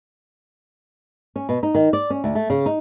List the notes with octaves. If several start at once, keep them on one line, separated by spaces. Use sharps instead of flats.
C#4
B2
D#4
D#3
D5
C#4
D2
A3
C#3
D#4